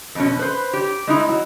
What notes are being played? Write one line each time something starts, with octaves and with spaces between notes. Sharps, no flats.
F2 B2 C#4
B4 C5
G4 C#5
G#3 D#4 E4
F#3